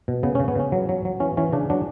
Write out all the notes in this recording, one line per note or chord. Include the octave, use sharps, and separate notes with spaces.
B2
C#3 B3
C#4
C#3
B3
C#3 C#4
F#3
F#3
F#3
E3 C#4
E3 C#4
C#3 D4
F#3 D4